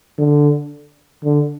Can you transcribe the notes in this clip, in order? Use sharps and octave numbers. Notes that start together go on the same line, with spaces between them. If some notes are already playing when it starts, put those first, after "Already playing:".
D3
D3